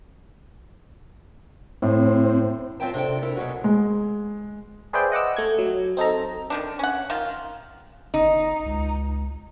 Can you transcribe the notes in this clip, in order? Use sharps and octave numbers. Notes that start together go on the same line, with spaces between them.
A2 C4
F#3 C4 F4 E5 G5 A5
C3 D4 A4 G5
E4 A4 A#4
B2 F#3 C#4 F#4
G#3
G#4 B4 C5 D5 E5 G5
D#5 F#5 D6 E6
A3 G#6
F#3
C4 D#4 A4 A#5
D3 D#3 D4
C#4 F#5
D#3 F4
G1 D#4
C#2